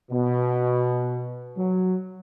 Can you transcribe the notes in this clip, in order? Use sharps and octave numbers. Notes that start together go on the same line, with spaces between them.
B2
F#3